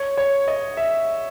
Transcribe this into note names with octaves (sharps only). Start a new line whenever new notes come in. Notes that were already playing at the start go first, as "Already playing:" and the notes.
Already playing: C#5
C#5
D#5
E5